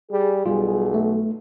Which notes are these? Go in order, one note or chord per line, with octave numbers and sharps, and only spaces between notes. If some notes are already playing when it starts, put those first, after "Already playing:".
G3 G#4
B1 G3 F4
A3